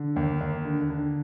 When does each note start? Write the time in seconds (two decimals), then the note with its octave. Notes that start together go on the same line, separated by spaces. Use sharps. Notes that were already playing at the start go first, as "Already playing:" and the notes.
Already playing: D3
0.16 D#2
0.41 D#2
0.65 D3
0.90 D3